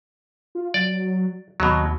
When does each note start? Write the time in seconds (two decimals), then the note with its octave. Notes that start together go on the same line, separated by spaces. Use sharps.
0.55 F4
0.74 F#3 D5
1.60 D#2 B2 F#3